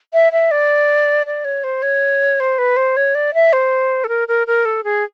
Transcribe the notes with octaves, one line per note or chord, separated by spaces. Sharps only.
E5
E5
D5
D5
C#5
C5
C#5
C5
B4
C5
C#5
D5
E5
C5
A4
A#4
A#4
A#4
A4
G#4